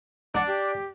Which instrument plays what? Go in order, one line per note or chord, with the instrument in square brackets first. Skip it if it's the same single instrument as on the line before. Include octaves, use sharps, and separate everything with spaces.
[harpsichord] D4 [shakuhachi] F#5
[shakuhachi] G4